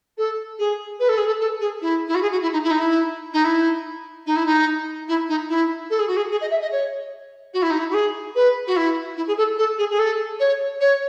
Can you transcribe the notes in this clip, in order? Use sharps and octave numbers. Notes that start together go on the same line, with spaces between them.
A4
G#4
B4
A4
G#4
A4
A4
G#4
E4
E4
F#4
G#4
F#4
E4
D#4
E4
D#4
E4
D#4
E4
D#4
E4
D#4
E4
D#4
E4
A4
G#4
F#4
G#4
G#4
D#5
E5
D#5
C#5
F#4
E4
D#4
E4
F#4
G#4
B4
F#4
E4
E4
G#4
A4
A4
G#4
G#4
A4
C#5
C#5